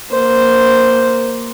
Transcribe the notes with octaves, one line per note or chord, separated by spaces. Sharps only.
A#3 C5